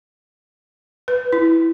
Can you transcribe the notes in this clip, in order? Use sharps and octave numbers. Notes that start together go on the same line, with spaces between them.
B4
E4